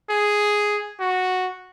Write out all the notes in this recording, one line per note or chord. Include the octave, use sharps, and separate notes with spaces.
G#4
F#4